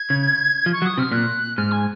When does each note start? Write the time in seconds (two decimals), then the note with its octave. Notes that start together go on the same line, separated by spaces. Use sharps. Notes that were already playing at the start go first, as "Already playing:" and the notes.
Already playing: G#6
0.10 C#3
0.66 F3
0.73 C#6
0.82 F#3
0.86 D#6
0.98 C3 F6
1.11 A#2 F#6
1.57 G#2 F6
1.72 G#5